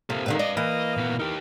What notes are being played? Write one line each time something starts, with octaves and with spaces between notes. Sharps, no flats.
C3 A#3 G4 A4
A2 D3 D#3 B4 F5
D5 D#5
E3 A#3 D#5
A#2 B3
D#4 G4 A#4